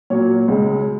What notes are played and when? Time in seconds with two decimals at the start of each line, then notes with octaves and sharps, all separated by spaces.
0.10 A#2 F#3 A#3 C#5
0.48 C#2 C#3 G#3